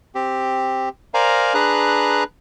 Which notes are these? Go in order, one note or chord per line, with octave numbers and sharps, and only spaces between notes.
C4 G4
A#4 C5 D5 F5 G#5 A#5
D4 G#4 B4 A#5 F#6